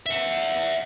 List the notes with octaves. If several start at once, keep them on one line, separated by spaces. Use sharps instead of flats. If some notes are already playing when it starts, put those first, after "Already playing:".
E5 F#5